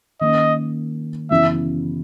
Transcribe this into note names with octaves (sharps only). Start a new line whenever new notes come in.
D#3 A#3 C#4 D#5
F#2 C#3 E3 B3 E4 E5